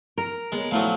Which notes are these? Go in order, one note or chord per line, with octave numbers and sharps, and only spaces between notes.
A#4
G#3 B3
A#2 F3 F#3 A3 E4